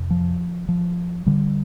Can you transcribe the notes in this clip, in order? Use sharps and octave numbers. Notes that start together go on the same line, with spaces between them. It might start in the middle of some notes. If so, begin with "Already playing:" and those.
Already playing: F2 C3
F3
F3
D3 G3